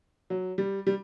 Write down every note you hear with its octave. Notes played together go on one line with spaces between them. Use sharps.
F#3
G3
G3